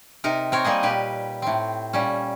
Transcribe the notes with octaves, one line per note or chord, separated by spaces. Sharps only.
C3 D#4 A#4
C4 A#4 C#5
G3 A#3 G#4 D#5
A#2 G4 B4
A2 C4
A#2 G3 C#4